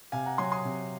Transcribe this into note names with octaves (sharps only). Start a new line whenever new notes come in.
C3 F5 G#5
F#5 A#5
F#3 G#5 C6
C6 D#6
C3